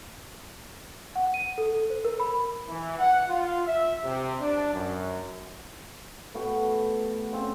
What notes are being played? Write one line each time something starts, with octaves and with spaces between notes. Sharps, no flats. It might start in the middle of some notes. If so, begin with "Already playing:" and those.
F#5
D#7
A4
A4
C5
A#4
B5
E3
F#5
F4
E5
C3
D4
F#2
A2 B3 F#4 G4
C#3 C4 C#4 G4